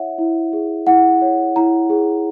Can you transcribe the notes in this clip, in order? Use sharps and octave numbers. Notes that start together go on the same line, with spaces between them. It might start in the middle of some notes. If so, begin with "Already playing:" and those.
Already playing: E4 C#5 E5 F#5
E4
G#4
E4 F#5
C#5
E4 A#5
G#4